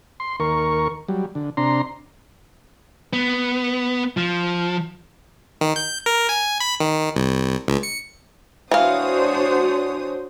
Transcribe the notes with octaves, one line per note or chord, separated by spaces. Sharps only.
C6
D#2 A#4 C#6
F#3 G3
D3
C3 D4 A#5 C6
B3
F3
D#3
G6
A#4
G#5
B5
D#3
C2
C#2
C#7
E3 D4 F#4 C5 C#5 F5 D#6